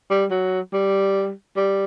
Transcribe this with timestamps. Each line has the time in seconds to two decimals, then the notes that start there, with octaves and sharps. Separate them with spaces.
0.10 G3
0.31 F#3
0.73 G3
1.56 G3